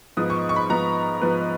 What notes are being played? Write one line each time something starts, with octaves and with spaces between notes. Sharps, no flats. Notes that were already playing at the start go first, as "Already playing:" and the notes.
G#2 F3 B3 D#6
C#6
C#6
B5
G#2 F3 B3 A#5
G#2 F3 B3 B4